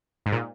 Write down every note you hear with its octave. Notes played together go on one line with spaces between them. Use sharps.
G#2
A#2